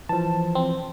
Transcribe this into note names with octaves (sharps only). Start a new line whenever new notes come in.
E3 F3 A5
C4